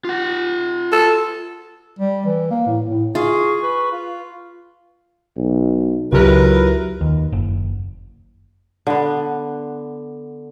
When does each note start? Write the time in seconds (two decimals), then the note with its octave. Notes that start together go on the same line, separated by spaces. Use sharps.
0.05 F4 F#5
0.92 A4
1.99 G3
2.25 E3
2.51 A#3
2.67 A2
2.88 A2
3.15 F4 G#4 C#6
3.63 B4
3.92 F4
5.37 B1
6.13 C#2 C#3 F#3 E4 F4 G4 A#4 B4
7.01 D#2
7.32 F#1
8.87 D3 B3